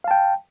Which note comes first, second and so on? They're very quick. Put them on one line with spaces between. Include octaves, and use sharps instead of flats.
F5 A5 G5